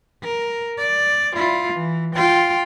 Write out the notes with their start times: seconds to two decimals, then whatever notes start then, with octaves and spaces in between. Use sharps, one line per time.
0.23 A#4
0.78 D5
1.35 E4 F4
1.73 E3
2.15 F4 G5